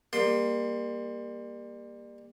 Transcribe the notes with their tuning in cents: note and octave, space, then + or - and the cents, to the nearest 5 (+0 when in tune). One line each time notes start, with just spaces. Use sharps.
G3 +30 A#3 +10 C6 +0